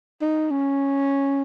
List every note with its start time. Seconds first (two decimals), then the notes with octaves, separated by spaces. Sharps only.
0.21 D#4
0.51 C#4